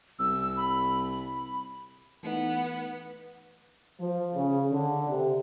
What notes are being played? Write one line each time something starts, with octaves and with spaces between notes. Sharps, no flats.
C2 E6
B5
E3 A3 B3 D#4
F3
C#3
D3
C3